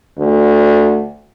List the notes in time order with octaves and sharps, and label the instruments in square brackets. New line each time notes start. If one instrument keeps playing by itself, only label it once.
[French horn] D2